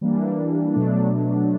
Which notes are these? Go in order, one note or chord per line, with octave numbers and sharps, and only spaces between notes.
E3 G3 A#3 D4
B2 F#3 A3 D4